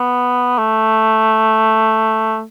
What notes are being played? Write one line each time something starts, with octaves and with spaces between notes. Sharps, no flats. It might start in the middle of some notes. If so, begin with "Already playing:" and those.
Already playing: B3
A3